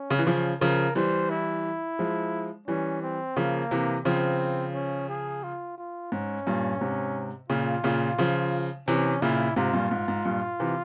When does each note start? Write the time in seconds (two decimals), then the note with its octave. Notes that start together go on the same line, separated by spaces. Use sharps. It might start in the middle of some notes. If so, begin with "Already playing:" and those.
Already playing: C#4
0.11 C#3
0.19 E3
0.27 C#3 F3
0.61 C#3 F3 A#4
0.95 E3 G3 C5
1.30 E4
1.99 F3 G#3
2.68 E3 G3 C#4
3.02 C4
3.37 C#3 F3 A#3
3.71 C3 E3
4.05 C#3 F3 C4
4.74 C#4
5.09 G#4
5.43 F4
5.78 F4
6.12 G#2 C#4
6.47 G2 A#2
6.81 G#2 C3
7.50 A#2 C#3 F4
7.84 A#2 C#3
8.19 C#3 F3
8.88 C3 E3 C#4
9.22 A#2 C#3 E4
9.56 G#2 C3 F4
9.73 G2 A#2
9.91 G#2
10.08 G#2
10.25 G2 A#2
10.60 C3 E3